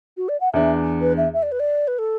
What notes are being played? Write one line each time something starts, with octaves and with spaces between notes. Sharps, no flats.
F#4
D5
F#5
E2 E3 B3 D4 E5
B4
E5
E5
D5
B4
D5
B4
A4